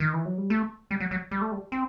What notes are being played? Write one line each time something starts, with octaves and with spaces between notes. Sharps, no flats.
D#3
E3
F#3
G3
A3
G3
F#3
F#3
G3
A3
G3
C4